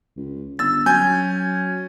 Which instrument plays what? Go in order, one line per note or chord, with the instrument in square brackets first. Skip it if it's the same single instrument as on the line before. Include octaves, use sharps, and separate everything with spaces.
[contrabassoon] C#2
[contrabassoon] G1 [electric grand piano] E6 A6
[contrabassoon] F#3 [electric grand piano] C#4 G#5 G6